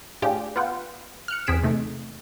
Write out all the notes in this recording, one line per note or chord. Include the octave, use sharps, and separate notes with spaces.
A2 D4 F4 G4 G#4
B3 F4 F#5 G5
F6 F#6 C#7
E2 C4 G#4 B6 D7 E7
C3 A3 D#4